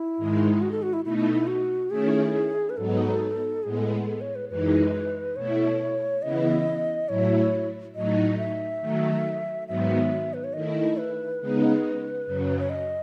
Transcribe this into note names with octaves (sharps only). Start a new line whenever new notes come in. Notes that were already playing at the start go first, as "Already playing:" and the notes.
Already playing: E4
G#2 D#3 G#3 D#4
F#4
A4
F#4
E4
B2 A3 D#4 E4
E4
E4
F#4
D#3 A3 C#4 E4 G#4
B4
G#2 F#3 B3 D#4 A4
A2 G#3 B3 G#4
A4
A4
C#5
B4
F#2 E3 G#3 D#4 B4
B2 A3 E4 C#5
C#3 E3 B3 E4 D#5
A2 F#3 A3 E4 C#5
A2 F#3 A3 D#4 D#5
E5
D#3 F#3 A3
G#2 D#3 F#3 B3 E5
B4
C#5
D#3 A3 E4 D#5
B4
C#3 G#3 B3 D#4
F#2 C#3 F#3
C#5
D#5